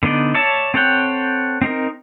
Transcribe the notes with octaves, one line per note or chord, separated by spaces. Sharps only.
D3 B3 D#4 D5
C#5 D5 E5 A5
C4 A4 C#5 F#5 G5
C4 D#4 A#4